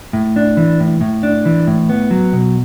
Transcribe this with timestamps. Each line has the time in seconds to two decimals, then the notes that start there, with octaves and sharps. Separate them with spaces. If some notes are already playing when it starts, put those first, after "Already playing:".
0.13 A2
0.36 D4
0.57 E3
0.80 A2
1.01 A2
1.23 D4
1.45 E3
1.67 A2
1.89 B3
2.11 F#3
2.33 B2